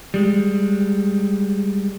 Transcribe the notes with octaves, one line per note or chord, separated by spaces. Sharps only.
G3 G#3